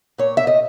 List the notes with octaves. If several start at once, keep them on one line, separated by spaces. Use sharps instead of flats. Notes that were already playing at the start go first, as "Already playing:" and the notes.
A#2 C#5
E5
D#5